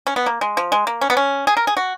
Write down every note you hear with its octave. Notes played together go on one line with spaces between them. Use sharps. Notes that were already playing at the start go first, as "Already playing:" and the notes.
C#4
B3
A#3
G#3
F3
G#3
A#3
C#4
B3
C#4
G#4
A#4
G#4
F#4